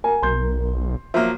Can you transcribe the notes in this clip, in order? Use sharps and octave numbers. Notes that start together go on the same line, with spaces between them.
A#4 G#5
B1 C6 G6
F3 F#3 A#3 E5